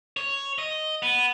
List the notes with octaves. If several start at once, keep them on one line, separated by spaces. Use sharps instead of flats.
C#5
D#5
B3